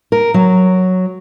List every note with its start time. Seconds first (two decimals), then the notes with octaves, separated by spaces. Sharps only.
0.12 A#4
0.34 F#3